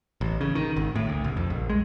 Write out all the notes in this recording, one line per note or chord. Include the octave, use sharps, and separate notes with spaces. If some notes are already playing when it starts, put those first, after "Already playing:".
A1
C#3
D#3
G#1
A2
D2
C2
F2
A#1
G#3